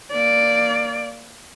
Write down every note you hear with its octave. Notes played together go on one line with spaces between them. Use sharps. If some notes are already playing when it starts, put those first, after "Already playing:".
A#3 D5